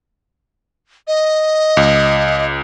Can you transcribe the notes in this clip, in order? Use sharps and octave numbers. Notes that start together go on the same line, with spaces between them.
D#5
C#2